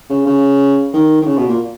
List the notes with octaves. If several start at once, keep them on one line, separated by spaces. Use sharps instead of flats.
C#3
C#3
D#3
D#3
C#3
B2
A#2